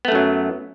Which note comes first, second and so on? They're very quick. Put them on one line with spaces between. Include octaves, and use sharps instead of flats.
B3 A3 F#2 F#3